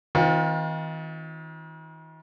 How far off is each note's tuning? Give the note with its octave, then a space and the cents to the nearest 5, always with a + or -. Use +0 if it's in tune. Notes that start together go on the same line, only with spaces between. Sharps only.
D#3 +45 C4 -5 F4 +35